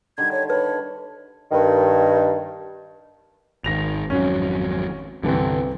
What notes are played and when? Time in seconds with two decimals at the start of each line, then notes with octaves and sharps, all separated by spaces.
0.18 D3 D#3 G3 G#6
0.32 C#5
0.50 A4 B4 C#5 B5
1.51 G2 D#3
3.64 G#1 D#3 A#6 F7
4.10 G#1 F2 F#3 C#4
5.24 C2 G2 D3 E3 C4